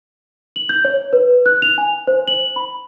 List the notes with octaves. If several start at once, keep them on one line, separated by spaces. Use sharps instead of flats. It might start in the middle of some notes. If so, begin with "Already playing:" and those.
F#7
G6
C#5
B4
F#6
F7
G#5
C5
F#7
B5